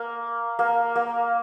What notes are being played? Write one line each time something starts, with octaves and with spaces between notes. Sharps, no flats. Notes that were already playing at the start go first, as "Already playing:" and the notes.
Already playing: A#3
A#3
A#3